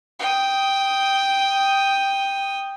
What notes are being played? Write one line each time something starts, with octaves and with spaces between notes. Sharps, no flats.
G5 D#6